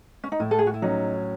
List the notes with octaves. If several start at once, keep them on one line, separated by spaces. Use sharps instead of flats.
C#4
D#4
A2 E4
A4
G#4
F#4
E4
F#3 C#4 D#4